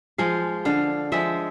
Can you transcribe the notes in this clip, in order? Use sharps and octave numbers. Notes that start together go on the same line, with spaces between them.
F3 G#3 F5
D3 F5
F3 G#3 E5